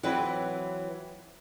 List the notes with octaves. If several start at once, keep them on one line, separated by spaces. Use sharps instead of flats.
E3 F#3 C4 E4 B4